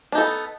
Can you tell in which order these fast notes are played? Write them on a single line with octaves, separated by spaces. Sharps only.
D4 D#4 A4 B3